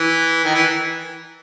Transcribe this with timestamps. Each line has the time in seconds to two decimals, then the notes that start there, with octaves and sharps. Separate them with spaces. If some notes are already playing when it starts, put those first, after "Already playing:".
Already playing: E3
0.44 D#3
0.54 E3